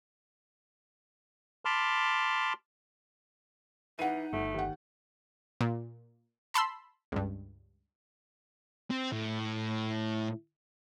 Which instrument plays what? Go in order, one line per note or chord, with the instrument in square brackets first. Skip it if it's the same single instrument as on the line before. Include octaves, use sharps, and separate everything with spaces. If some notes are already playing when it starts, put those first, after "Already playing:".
[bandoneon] A5 B5 C6 D6 F6
[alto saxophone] E3 [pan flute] D#4 [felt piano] F#5 D#7
[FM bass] G1 [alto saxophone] A3
[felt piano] D#2 F#5
[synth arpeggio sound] A#2
A5 B5 C6 E6
C#2 G2
[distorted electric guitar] C4
A2